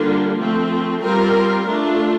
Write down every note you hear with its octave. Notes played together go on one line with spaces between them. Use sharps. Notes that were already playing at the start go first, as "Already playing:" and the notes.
Already playing: D3 G3 A#3 D4 F4
F3 A3 C4
G3 C4 F4 A#4
A3 D4 F4